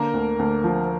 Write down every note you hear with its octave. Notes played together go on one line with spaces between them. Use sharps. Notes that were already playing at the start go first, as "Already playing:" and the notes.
Already playing: D3 A#3 A#4
D2
D2
F3